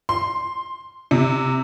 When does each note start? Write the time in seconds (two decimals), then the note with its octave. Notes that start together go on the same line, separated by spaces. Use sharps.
0.09 C6
1.11 C3